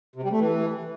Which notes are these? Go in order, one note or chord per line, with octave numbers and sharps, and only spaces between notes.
C3
G3
A3
E3